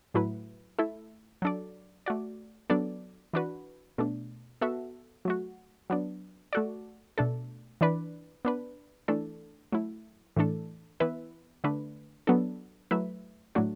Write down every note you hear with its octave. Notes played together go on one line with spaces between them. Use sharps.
A2 F#3 A3 E4 B4
A3 E4 A4 E5
F#3 D4 A4 D5
A3 F#4 D5
F#3 B3 D4 A4 D5
E3 D4 F#4 B4
B2 A3 D4
B3 F#4 A4 E5
F#3 A3 F#4
F#3 B3 D4
A3 F#4 A4 D5
B2 A3 D4 A4
E3 D4 B4 D5
B3 D4 B4
E3 A3 D4 A4
F#3 A3 E4
A2 E3 A3 D4 A4
E3 B3 E4 B4 E5
D3 A3 D4 B4
F#3 B3 D4 A4
F#3 A3 E4 B4 E5
A2 F#3 A3 D4 F#4